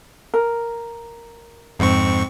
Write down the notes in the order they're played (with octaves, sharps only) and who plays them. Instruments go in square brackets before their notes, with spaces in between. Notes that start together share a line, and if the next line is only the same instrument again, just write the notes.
[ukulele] A#4
[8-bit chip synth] F2 G#2 C#6 [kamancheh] C4